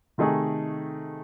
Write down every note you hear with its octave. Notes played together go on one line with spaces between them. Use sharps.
C3 D#3 A3 D#4 G#4